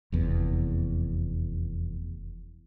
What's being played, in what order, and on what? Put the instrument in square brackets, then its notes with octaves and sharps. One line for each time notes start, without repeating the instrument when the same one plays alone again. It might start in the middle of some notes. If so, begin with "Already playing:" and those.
[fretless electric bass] F1 E2